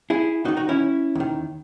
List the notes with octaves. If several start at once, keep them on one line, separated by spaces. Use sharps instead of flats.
E4 G#4
D#2 D#3 D#4 F#4
D#4 F#4
C#4 E4
D#2 D#3